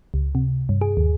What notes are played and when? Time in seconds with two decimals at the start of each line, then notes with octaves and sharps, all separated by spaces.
0.14 C#2
0.35 C3
0.69 G2
0.81 G#4
0.97 D#2